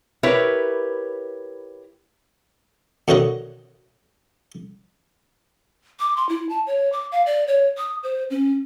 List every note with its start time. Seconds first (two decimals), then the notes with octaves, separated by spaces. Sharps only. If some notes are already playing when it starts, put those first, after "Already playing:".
0.23 E4 G4 A#4 B4 C#5 E5
3.08 B2 D3 D#3 C#5 D#5 F#5
6.00 D6
6.17 C6
6.29 E4
6.49 A5
6.67 C#5
6.92 D6
7.12 F5
7.26 D5
7.47 C#5
7.78 D#6
8.03 C5
8.30 C#4